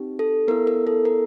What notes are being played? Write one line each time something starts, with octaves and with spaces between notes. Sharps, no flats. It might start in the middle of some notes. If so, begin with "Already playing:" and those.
Already playing: C4 D#4 G4
A4
B3 E4 A4 A#4
A#4
A4
A#4